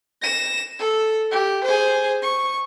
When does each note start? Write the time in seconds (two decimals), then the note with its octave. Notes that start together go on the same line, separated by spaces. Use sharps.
0.22 A#6 E7
0.79 A4
1.31 G4
1.64 G#4 C5
2.23 C#6